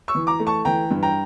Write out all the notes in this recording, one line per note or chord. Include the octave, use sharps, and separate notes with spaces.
C#6 E6
E3
A#5 D6
A3
A5 C#6
E3 G5 A#5
G2
G5 A#5